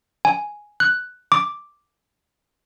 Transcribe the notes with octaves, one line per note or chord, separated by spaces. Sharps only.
G#5
F#6
D6